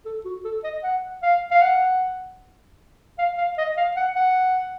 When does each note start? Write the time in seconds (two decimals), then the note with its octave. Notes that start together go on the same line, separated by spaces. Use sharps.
0.05 A4
0.25 F#4
0.45 A4
0.64 D#5
0.84 F#5
1.23 F5
1.51 F5
1.62 F#5
3.19 F5
3.38 F5
3.58 D#5
3.77 F5
3.96 F#5
4.16 F#5